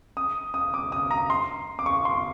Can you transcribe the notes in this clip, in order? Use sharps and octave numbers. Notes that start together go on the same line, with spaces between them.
D#6
D#6
D6
D#6
A#5
C6
D6
C#6
C6